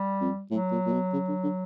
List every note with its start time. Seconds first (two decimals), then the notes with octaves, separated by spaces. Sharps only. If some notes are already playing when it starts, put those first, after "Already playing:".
Already playing: G3
0.20 F2
0.51 A2 F#3
0.71 A#2
0.86 A#2
0.93 B2
1.13 C#3
1.28 D3
1.43 D3